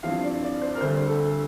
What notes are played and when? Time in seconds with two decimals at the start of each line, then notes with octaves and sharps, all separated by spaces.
0.03 G2 F3 C4 E4 F5
0.23 D5
0.42 D5
0.61 C5
0.75 A#4
0.81 D2 D3 G3 C5
1.07 A4